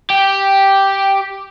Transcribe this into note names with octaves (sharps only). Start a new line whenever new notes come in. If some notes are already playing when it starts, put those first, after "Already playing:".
G4